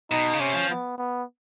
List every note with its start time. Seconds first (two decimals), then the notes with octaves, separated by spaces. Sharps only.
0.11 B2 D#4
0.33 C#3
0.40 C3 C#4
0.54 F3
0.69 B3
0.98 B3